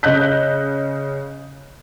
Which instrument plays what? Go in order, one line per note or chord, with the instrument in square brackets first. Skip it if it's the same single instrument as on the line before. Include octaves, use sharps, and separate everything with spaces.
[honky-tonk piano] C#3 D#5 F#6 G6 B6